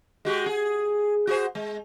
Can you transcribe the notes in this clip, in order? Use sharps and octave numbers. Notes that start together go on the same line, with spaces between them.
G#3 F#4 G4
G#4
F#4 G#4 C5
G#3